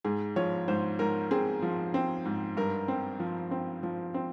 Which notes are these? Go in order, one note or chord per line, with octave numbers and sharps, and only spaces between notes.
G#2 G#4
F3 C#5
G#2 C5
G#2 A#4
C4 G#4
F3
C4
G#2
G2 A#4
C4
F3
C4
F3
C4